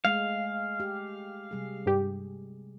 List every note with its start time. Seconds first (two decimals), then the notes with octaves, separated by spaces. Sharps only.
0.05 G#3 A3 F5
0.80 G4
1.51 C3 G3 G#4
1.86 G2 G4